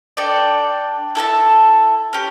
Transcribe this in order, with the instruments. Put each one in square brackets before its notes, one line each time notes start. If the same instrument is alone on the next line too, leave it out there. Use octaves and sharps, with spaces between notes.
[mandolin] D4 A4 D5 G5
E4 A4 E5 A5
C#4 G4 B4